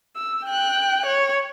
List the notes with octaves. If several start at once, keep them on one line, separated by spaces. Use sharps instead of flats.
E6
G5 F#6
C#5